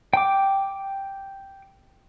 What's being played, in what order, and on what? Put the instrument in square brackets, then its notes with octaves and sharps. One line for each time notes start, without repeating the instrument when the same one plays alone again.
[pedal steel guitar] G5 D6